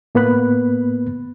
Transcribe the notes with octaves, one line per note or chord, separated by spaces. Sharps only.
A2 A#3 B3 B4 B5 F#6